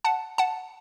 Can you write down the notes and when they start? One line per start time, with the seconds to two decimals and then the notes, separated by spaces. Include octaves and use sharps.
0.04 F#5 A5
0.38 F#5 A5